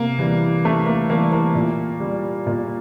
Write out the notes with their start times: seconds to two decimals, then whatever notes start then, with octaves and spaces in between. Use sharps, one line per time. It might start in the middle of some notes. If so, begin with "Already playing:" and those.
Already playing: C3 A#3
0.19 E3 G3
0.64 C3 A3
0.86 A#3
1.10 E3 G3 A#3
1.32 A#3
1.55 A#2
2.00 G3
2.47 A#2